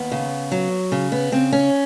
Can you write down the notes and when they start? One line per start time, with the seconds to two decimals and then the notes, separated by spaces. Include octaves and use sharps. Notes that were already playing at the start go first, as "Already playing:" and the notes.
Already playing: D#2 B3
0.12 C#3
0.52 F#3
0.92 C#3
1.12 B3
1.32 C#3 C4
1.52 C#4